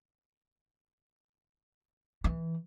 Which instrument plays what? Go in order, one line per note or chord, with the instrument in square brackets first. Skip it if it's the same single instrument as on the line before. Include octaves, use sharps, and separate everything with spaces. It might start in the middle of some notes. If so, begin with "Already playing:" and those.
[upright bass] E3